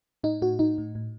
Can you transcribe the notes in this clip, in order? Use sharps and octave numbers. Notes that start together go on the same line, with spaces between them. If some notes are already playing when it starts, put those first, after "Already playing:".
A2 D#4
A2 F#4
A2 D#4
A2
A2